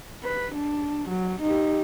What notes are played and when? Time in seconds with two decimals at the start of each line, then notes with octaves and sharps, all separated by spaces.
0.24 B4
0.55 D4
1.09 F#3
1.42 D#4 G4